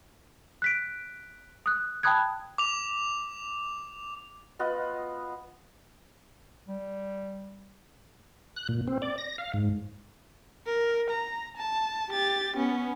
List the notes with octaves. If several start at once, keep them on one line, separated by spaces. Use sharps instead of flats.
F#6 B6 D7
D#6 F#6
G5 A5 B5 D#6 F#6 G#6
D6 F7
B3 F4 D#5 F#5
G3
F#6
A#2
C4
D5
A#6
F5
G#2
A#4
A#5
A5
G4 A6
B3 C#4